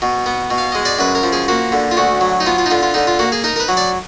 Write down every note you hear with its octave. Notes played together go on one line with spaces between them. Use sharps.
B2
B3
B2
F5
G#3 D#5
D5
F#2 B4
A#4
F3
G#4
A#3 F#4
D3
F4
D2 F#4
F#3
D#4
B3 F4
F4
D#4
D3 F4
F4
D3 D#4
F4
A#3 F#4
G#4
D#4 A#4
A#4
B4
F#3
D5